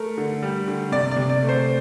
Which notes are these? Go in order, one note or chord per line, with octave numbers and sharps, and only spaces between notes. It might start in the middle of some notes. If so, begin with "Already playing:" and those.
Already playing: A3 A#4
D3
G3
D3
C3 D5
D5
C3
D5
A3
C5